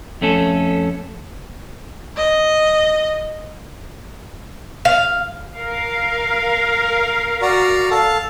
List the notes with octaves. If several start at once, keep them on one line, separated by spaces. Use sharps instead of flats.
F2 A3 C#4 A4
D#5
F5
A#4 F5
F#4 D5 A#5
A4 F5 A5